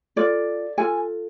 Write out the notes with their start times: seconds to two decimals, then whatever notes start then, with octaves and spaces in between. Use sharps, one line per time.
0.16 F4 A4 D5
0.78 F4 A4 G#5